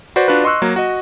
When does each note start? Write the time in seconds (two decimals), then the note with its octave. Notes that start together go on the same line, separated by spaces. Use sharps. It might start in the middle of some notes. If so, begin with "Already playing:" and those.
0.16 F#4 B4 C5 D5
0.28 D4 F4 F#4 B4
0.44 D#5 C6 C#6 E6 F#6
0.62 F#3 A#3
0.76 F#4 D#5